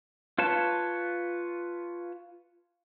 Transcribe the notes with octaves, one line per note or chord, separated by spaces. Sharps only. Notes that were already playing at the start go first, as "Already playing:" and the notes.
F4 B4 C#5 A5